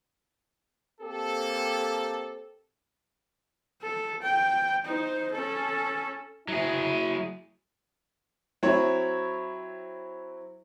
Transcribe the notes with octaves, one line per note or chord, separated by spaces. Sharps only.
A#3 C4 G4 A4
A4
G5
D#4 C5
C#4 A4
F#3 E4 G#4
F#3 C4 E4 C#5